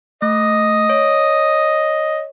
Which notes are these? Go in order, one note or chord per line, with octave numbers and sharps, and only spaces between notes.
A3 D#5
C#5